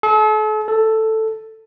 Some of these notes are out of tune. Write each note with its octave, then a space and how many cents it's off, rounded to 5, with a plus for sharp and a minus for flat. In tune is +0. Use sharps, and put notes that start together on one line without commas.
A4 -40
A4 +5